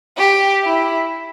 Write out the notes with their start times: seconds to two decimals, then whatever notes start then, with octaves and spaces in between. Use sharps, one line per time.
0.18 G4
0.64 E4